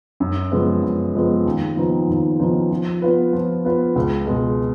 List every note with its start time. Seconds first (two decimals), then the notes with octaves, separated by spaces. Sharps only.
0.20 F#2
0.52 C#3 F3 G#3 B3
0.83 F#2
1.14 C#3 F3 G#3 B3
1.46 D#2
1.77 C#3 F3 B3 D#4
2.08 D#2
2.39 C#3 F3 B3 D#4
2.71 F3
3.02 B3 F4 B4
3.33 F3
3.65 B3 F4 B4
3.96 C#2
4.27 B2 G#3